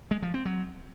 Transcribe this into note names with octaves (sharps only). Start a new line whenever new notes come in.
G#3
F3
C4
F#3